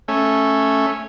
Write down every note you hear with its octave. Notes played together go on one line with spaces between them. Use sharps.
A3 C#4